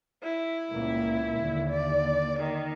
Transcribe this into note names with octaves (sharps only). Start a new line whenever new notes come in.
E4
C#2 A#2 A#3
D#2 D3
D5
D#3